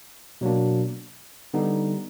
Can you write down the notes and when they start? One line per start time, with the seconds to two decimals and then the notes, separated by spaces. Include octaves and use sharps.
0.41 B2 F#3 A#3 D4
1.54 D3 G3 B3 D#4